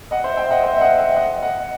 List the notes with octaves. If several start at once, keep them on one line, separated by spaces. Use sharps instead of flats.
D#5 F#5
C5 E5
E5 G5
D#5 F#5
C5 E5
E5
D#5 F#5
E5 G5
D#5 F#5
D#5 F#5